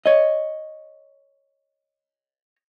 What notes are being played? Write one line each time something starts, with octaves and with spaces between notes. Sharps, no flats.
C#5 D#5